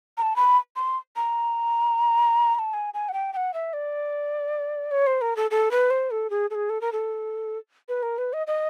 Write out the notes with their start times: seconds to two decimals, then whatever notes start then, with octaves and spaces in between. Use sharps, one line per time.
0.18 A#5
0.22 A5
0.36 B5
0.76 C6
1.16 A#5
2.55 A#5
2.59 A5
2.73 G#5
2.94 G#5
3.09 F#5
3.13 G5
3.33 G5
3.36 F#5
3.54 E5
3.73 D5
4.91 C#5
5.07 C5
5.21 A#4
5.37 A4
5.51 A4
5.71 B4
5.90 C5
6.11 A4
6.30 G#4
6.50 A4
6.55 G#4
6.70 A4
6.81 A#4
6.92 A4
7.89 B4
8.03 A#4
8.18 B4
8.33 D#5
8.47 D#5